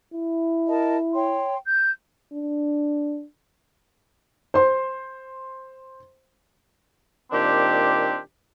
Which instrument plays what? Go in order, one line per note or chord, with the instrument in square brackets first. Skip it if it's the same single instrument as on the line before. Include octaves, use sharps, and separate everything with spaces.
[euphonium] E4
[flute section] A#4 D#5 A5
C#5 G5 C6
G6
[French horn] D4
[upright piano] C5 C6
[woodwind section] A#2 D#3 C4 D4 G4